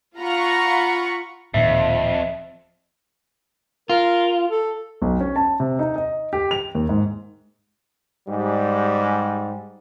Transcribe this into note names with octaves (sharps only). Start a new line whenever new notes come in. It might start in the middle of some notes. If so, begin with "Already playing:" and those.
F4 F#5 A#5 B5 C#6
D1 F2 A#2 D#3 E5
F4 A#4
A4
B1
C#4
A5
C3
D#4
D#5
G4
F7
D#2
G#2
G#2 G3